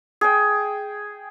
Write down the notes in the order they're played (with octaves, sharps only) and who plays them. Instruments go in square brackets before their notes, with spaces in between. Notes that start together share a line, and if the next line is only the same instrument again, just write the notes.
[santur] G#4 G5